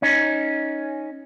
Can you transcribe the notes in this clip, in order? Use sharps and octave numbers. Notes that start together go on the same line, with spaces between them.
C#4 D#4